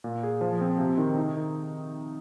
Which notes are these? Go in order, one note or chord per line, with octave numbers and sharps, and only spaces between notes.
A#2
G#4
F3
C4
C3
D#3
D#4
D#3